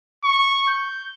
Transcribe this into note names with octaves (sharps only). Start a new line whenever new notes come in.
C#6
G6